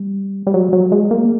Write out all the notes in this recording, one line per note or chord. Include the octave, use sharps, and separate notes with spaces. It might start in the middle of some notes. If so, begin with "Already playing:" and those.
Already playing: G3
G3
F#3
F#3
G#3
A#3